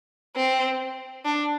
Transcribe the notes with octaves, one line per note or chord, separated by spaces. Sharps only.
C4
D4